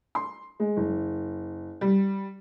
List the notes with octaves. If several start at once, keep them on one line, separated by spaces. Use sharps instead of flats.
C6
G#3
F#1
G3